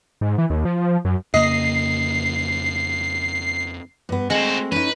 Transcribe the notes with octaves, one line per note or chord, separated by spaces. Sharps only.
G#2
E3
D#2
F3
F#2
F2 C#3 A#3 D#5 C7
G2 B3
G#3 A3 C4 F#4 C5
C#4 D#4 B4